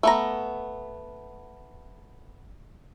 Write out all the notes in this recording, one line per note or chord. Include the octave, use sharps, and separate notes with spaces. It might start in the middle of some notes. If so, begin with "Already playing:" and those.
A3 B3 A#5